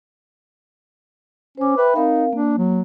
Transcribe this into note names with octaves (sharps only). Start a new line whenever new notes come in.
C#4 C5 D6
B4 E5 G5 B5
C4 D#4 A#4 F5
A#3 D4
F#3